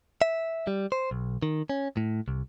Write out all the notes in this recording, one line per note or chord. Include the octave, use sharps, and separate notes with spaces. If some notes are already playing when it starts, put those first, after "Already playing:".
E5
G3
C5
B1
D#3
C#4
A2
C2